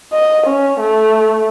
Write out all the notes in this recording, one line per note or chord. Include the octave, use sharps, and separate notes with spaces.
D#5
C#4
A3